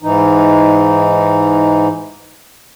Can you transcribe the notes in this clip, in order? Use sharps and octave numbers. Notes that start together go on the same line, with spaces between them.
G#2 E3 D#4